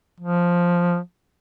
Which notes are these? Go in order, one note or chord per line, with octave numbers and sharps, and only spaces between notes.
F3